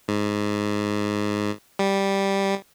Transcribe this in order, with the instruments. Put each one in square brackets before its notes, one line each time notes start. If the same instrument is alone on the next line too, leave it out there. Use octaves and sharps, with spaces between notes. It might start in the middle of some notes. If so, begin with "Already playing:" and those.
[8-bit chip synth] G#2
G3